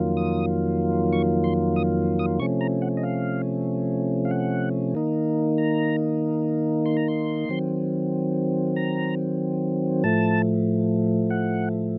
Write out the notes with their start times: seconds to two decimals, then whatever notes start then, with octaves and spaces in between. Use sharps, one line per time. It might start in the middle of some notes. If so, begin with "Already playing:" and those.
Already playing: F2 D#3 F#3 A#3 F4
0.17 D#6
1.13 C#6
1.44 C6
1.76 D#6
2.19 D#6
2.39 C3 F3 A3 C#4 C#6
2.61 A#5
2.82 F#5
2.97 D#5
3.03 F5
4.25 F5
4.31 F#5
4.95 D#3 A#3 D#4
5.58 A#5
6.86 C6
6.97 A#5
7.08 C6
7.49 D#3 F#3 C4
8.76 A#5
10.04 A2 F3 A3 A5
11.30 F#5